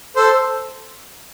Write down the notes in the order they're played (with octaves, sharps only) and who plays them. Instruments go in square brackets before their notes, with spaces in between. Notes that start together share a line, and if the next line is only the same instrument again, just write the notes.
[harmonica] A4 C5